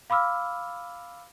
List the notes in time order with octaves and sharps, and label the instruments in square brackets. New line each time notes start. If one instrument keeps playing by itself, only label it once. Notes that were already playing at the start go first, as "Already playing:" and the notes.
[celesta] F5 B5 D6 E6 F6